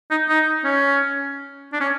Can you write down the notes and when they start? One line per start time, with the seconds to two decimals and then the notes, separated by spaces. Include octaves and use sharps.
0.11 D#4
0.29 D#4
0.64 C#4
1.73 D4
1.80 C#4